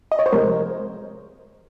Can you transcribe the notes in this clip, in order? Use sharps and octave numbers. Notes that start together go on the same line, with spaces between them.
D#5
C#5
C5
C3 F3 G#3 A#4